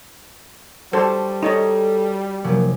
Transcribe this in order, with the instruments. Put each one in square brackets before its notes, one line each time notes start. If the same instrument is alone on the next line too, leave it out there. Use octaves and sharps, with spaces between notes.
[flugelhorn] G3 [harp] D4 F#4 A5 [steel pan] A4 C5
[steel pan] D#4 C#5 D#5 [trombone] A4
[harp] F1 C3 F#3 [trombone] A#3